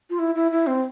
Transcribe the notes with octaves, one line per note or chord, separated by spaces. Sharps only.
F4
E4
E4
E4
C4